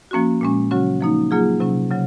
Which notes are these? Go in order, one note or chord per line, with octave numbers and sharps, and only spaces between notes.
F3 A#3 C#4 F#4
A#2 G#3 C#4
C#3 F#3 C#4 F#4
F3 A#3 D#4
F#3 A#3 F4 G#4
C3 F#3 C#4
C#3 F#3